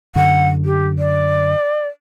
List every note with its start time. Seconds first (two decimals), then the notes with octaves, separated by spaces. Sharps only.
0.15 F#2 D3 F#5
0.65 G4
0.98 D5